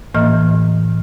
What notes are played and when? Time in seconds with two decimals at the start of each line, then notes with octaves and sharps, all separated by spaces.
0.14 A2 E3 A#3 D#5 F6